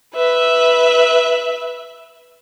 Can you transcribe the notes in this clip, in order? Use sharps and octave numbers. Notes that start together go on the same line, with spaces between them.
B4 E5